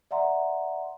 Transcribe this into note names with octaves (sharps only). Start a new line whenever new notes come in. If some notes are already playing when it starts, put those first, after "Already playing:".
D5 E5 F#5 A#5 C6